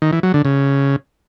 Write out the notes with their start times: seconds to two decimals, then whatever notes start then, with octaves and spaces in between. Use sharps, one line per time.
0.02 D#3
0.13 E3
0.23 F#3
0.34 D3
0.45 C#3